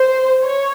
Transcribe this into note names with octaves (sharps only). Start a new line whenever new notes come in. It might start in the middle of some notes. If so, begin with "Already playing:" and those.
Already playing: C5
C#5